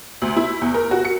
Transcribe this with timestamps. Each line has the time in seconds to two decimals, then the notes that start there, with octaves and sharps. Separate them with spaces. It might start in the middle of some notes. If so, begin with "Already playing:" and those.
0.22 D2
0.37 E4
0.62 E2
0.74 A#4
0.91 F#4
1.05 C#7